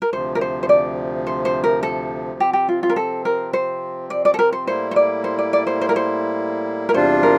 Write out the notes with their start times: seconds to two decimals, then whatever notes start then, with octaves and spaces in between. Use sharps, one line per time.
0.02 A#4
0.12 D2 C3 F3 C5
0.35 A#4
0.41 C5
0.63 C5
0.69 D5
1.27 C5
1.45 C5
1.64 A#4
1.83 A4
2.40 C3 F3 C4 G4
2.53 G4
2.69 F4
2.83 F4
2.90 A#4
2.96 A4
3.25 A#4
3.53 C5
4.10 D5
4.25 D5
4.34 A4
4.39 A#4
4.53 C5
4.67 A2 G3 A#3 E4 C5
4.91 C5
4.96 D5
5.24 C5
5.38 D5
5.53 D5
5.67 C5
5.81 C5
5.89 A#4
5.96 C5
6.89 A#4
6.94 E2 C3 G3 D4 F4 C5
7.23 A#4